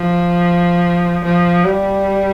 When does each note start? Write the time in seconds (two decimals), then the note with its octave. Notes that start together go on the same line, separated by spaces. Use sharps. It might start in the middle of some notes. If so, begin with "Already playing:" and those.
Already playing: F3
1.25 F3
1.64 G3